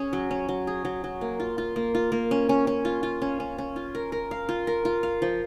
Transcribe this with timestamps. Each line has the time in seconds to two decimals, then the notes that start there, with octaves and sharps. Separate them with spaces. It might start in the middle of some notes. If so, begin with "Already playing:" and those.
Already playing: C#4 G#4
0.13 F#3
0.31 C#4
0.49 F#3
0.67 G#4
0.85 F#3
1.04 F#3
1.21 A#3
1.40 F4
1.58 F4
1.76 A#3
1.95 F4
2.12 A#3
2.31 C#4
2.49 C#4
2.67 C#4
2.85 F4
3.03 F4
3.22 C#4
3.40 C#4
3.58 C#4
3.76 F4
3.95 A#4
4.12 A#4
4.31 F5
4.49 F4
4.67 A#4
4.85 F4
5.03 F5
5.22 F3